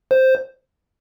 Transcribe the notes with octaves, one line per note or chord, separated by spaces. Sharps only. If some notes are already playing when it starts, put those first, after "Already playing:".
C5